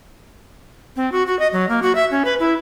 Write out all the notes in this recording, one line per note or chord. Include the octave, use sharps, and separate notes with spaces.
C4
F#4
F#4
D#5
F#3
A#3
F#4
E5
C#4
B4
E4